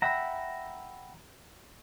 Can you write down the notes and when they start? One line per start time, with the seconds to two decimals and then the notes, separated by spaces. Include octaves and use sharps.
0.02 E5 F#5 G5 A#5 B5